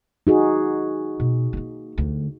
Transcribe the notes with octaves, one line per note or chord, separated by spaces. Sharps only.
D#4 F#4 G#4
B2
A3 A#3
D2